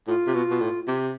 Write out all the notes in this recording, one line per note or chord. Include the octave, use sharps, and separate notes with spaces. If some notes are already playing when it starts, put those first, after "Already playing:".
A2 F4
C3
B2
B2
A2
C3